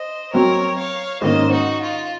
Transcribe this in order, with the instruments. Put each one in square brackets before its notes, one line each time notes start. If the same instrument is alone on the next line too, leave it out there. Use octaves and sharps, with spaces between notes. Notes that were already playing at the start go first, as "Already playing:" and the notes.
Already playing: [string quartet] C5 D#5
[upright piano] F#3 C4 F#4 [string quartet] A#4 C#5
[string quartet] C#5 F5
[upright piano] G#2 D#3 A#3 C#4 [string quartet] C5 D#5
[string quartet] D#4 F#4
F4